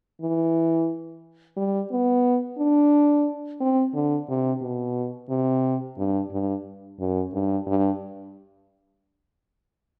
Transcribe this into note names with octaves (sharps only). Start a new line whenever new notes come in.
E3
G3
B3
D4
C4
D3
C3
B2
C3
G2
G2
F#2
G2
G2